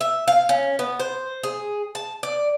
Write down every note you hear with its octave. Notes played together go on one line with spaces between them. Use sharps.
E5
F5
C#4
B3
C5
G#4
A5
D5